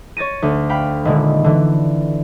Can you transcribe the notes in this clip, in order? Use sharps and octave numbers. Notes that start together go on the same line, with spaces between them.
C#5 A6 A#6 D#7
D2
F5 G5 B5
D#1 D3 G#3
D3 E3